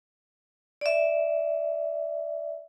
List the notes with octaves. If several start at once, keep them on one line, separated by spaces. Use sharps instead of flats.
D5 E5